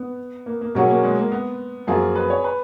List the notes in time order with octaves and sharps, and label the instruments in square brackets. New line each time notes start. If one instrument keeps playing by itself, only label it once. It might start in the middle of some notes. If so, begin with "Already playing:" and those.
Already playing: [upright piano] B3
A#3
A#3
[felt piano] B2 F#3 C#4 G#4 [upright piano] A#3
[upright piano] A#3
G#3
A#3
B3
[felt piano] F#2 F3 A#3 F4 [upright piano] G#4
[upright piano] B4
C#5
B4